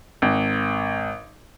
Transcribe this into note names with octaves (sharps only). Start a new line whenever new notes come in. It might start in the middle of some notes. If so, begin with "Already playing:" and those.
G#1